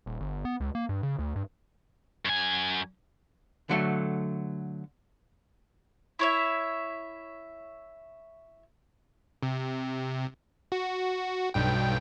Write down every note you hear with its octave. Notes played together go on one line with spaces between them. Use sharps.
D#1
G1
B3
C#2
A#3
G2
C#3
D2
G2
F#2 G#5
D3 F#3 A3
E4 C#5 E5
C3
F#4
B1 G2 G5